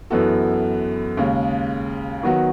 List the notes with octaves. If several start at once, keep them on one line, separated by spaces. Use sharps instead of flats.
F#2 E3 B3 F#4 A4
D#2 C#3 G#3
D#3 F#3 B3 F#4